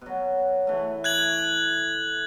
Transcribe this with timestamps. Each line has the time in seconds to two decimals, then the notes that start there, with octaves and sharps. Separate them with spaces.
0.01 B2 F#3
0.67 E3 A3
1.04 F#6 G#6 F#7